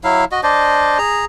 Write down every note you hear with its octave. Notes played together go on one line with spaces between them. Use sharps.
F#3 E4 F5
F#4 D#5
D4 C5 D5 D#5
G#4 A#5